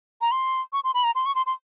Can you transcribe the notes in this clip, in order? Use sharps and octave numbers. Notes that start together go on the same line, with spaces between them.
A#5
C6
C#6
C6
B5
A#5
C6
C#6
C6
C6